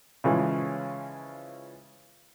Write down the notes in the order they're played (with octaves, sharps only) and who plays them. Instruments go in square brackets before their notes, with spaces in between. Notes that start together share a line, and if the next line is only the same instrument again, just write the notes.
[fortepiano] C#3 E3 F3 G#3